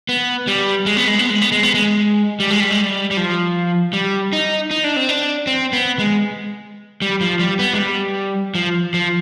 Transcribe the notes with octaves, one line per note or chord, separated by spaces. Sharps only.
B3
G3
G#3
B3
G#3
B3
G#3
B3
G#3
B3
G#3
G3
G#3
G3
G#3
G3
G3
F3
G3
D#4
D#4
D4
C4
D4
C4
B3
G#3
G3
F3
G3
B3
G#3
G3
F3
F3